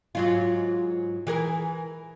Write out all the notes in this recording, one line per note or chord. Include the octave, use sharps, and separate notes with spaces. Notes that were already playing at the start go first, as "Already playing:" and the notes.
G#2 F#3 F4
E3 G#4 A#4